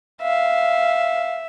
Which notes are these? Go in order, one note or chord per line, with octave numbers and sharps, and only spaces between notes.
E5 F5